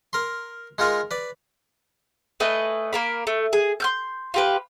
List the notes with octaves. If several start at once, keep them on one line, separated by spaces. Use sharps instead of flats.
A#4 C6
G#3 D#4 F4 A#4
B4 D5
A3 B4 D#5 G#5
A#3 A#4 B5
A3
G#4
C6 F6 G6
F4 G4 B4